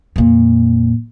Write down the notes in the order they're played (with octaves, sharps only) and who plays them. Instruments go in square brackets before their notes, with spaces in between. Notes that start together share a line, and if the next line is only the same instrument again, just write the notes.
[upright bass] F2 A#2